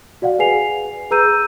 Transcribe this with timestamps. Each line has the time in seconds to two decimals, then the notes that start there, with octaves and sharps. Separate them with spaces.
0.22 F#4 D5 F5 F#5
0.39 G#4 B4 G#5 C7 F7
1.11 G#4 B4 A#5 E6 G6 D#7